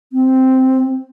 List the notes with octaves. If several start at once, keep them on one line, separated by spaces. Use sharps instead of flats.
C4